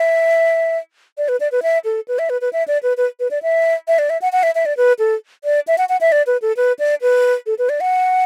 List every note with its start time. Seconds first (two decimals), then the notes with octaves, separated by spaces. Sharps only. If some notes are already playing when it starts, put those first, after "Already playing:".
Already playing: E5
1.18 D5
1.29 B4
1.40 D5
1.52 B4
1.63 E5
1.85 A4
2.08 B4
2.19 E5
2.30 B4
2.41 B4
2.53 E5
2.68 D5
2.83 B4
2.97 B4
3.20 B4
3.31 D5
3.43 E5
3.88 E5
3.99 D5
4.10 E5
4.22 F#5
4.33 F#5
4.43 E5
4.55 E5
4.66 D5
4.77 B4
4.99 A4
5.44 D5
5.67 E5
5.78 F#5
5.89 F#5
6.01 E5
6.12 D5
6.27 B4
6.42 A4
6.57 B4
6.79 D5
7.02 B4
7.46 A4
7.59 B4
7.69 D5
7.81 F#5